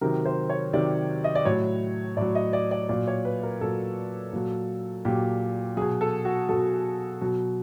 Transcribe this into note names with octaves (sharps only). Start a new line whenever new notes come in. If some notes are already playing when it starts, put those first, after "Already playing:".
C3 D#3 F#3 A#4
C5
C#5
C3 D#3 F#3 D5
D#5
D5
A2 F#3 C#5
A2 F#3 D5
D#5
D5
D5
A#2 F#3 D5
C#5
B4
A#4
A#2 F#3 A4
A#2 F#3
A#2 F#3 G4
B2 F#3 G#4
A4
F#4
B2 F#3 A4
B2 F#3